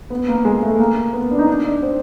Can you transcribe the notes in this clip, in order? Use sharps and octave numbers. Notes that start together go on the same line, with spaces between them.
B3
A#3
G#3
A3
A#3
B3
D4
D#4
D4
D4
C4